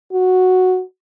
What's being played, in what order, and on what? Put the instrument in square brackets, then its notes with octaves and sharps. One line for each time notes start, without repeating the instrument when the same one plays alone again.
[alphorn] F#4